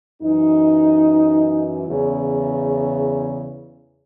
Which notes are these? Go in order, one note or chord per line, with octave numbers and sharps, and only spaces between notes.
F#2 E3 D#4
E2 C#3